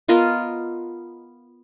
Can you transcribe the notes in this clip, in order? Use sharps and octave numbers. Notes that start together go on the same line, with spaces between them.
B3 F4 A#4 D#5